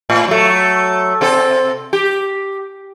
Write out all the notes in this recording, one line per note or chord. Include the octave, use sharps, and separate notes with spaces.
A2
F#3 A3
C3 C4 A4
G4